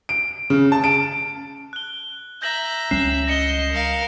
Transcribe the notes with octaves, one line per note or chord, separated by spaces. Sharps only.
D7
C#3
A5
D7
F#6 G7
E5 A#5 G6 A#6 F#7
C#2 G3 C#4 F#6 C7 E7
D#5 A#6 C#7 G7
A#4 F5